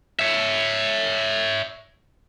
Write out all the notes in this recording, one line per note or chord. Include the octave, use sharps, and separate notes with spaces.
C#5 E5